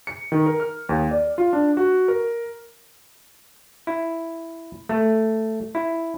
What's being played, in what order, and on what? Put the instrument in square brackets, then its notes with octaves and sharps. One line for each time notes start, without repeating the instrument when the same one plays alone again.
[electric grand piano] C#7
D#3
A#4
F6
D#2
D5
F4
D4
F#4
A#4
[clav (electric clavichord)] E4
A3
E4